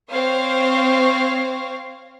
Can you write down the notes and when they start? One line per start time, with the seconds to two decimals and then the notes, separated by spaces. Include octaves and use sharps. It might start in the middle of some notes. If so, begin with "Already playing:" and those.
0.11 C4 C5 C#5 F5